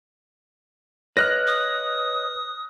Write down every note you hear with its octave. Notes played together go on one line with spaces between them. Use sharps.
B4 C#5 D#5 F6 F#6 A#6
D#6